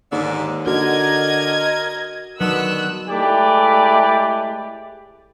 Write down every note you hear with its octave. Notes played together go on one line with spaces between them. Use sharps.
D#2 G#2 D3
D3 F#4 A#4 D#5 G#6
B2 D3 D#3 F#3 B3 E6 F#6
G#3 A3 E4 G4 B4 D5